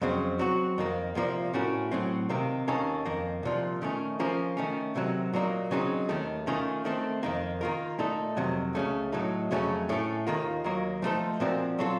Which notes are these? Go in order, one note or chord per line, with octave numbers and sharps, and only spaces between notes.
F2 C#3 F#3 C4
F#3 C4 F#4
F2 D#3 A#3
C2 A#2 F3 A#3
A2 A3 C#4 F#4 A#4
A2 F#3 C4
C3 D#3 A#3
D#2 D#3 A#3 C#4 A4
F2 D#3 A#3
C2 A#2 F3
D#3 A3 C#4
F3 A#3 C#4
D#3 A3 C#4
C3 D#3 F#3
A#2 F#3 A#3 D#4
C#3 F#3 C4 D#4
D#2 D#3 A3
D#3 A3 C#4 F4
D#3 A3 C4
F2 D#3 A#3
D#3 A#3 F4 A#4
A#2 A3 D#4 A4
F2 C3 D#3 F#3
C#2 C#3 A3
A2 F#3 A3 D#4
F2 C#3 F#3 A3 C#4
A2 A3 C#4 A4
D#2 D#3 A#3 F4
D#2 D#3 F#3 A#3
F3 A3 D#4 A4 C5
A#2 F3 C4 F#4 A#4
F#3 C4 F4 A4